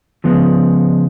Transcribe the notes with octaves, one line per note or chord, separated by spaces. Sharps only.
C#3 F3 G#3 B3